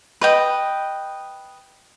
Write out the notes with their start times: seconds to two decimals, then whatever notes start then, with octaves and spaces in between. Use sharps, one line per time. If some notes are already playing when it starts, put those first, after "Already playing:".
0.21 B4 D#5 G5